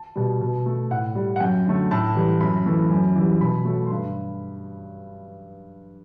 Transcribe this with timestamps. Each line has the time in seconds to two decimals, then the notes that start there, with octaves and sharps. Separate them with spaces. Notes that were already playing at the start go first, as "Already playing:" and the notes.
Already playing: A5
0.16 B2 G3
0.41 B2
0.66 A3
0.91 A2 F#5
1.15 G3
1.36 F#5
1.40 F#2 G5
1.66 D3 F#3 A3
1.91 A2 A5
2.15 E3 G3
2.41 F#2 B5
2.66 E3 A3
2.90 F#2
3.16 E3 G3
3.41 B2 B5
3.65 F#3 A3
3.86 C6
3.90 G2 B5